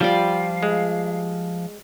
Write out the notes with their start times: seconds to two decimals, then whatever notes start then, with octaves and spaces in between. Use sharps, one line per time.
0.01 F3 G3 F4 D5 F5
0.63 G#3